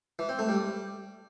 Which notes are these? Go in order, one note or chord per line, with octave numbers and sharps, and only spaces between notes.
E3
C4
A3
G3